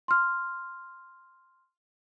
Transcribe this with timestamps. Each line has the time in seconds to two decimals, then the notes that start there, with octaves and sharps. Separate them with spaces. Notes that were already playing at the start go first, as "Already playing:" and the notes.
0.08 C6 F6